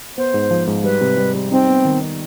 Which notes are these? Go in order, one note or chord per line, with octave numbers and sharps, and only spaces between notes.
B3 C5
G#2
F3
G#2
G3 B4
C3
G3
G3
C4 D#4
B3
D#3
D#4